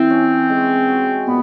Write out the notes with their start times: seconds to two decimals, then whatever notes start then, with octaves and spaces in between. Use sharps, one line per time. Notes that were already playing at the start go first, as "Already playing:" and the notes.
Already playing: E3 C4
0.10 C#4
0.50 G#3
0.88 F#4
1.26 A#2 B3